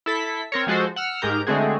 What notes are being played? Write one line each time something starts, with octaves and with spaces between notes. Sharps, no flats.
E4 A4 B6
C4 A#4 C#5
F3 G#3 F#4 A4 C5
F#5 E6 F6
G#2 G#3 G4 A#4 A#5 G6
D3 G#3 A3 C4 F#4 G#4